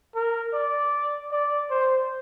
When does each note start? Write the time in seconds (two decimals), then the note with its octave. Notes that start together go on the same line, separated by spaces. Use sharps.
0.15 A#4
0.53 D5
1.32 D5
1.70 C5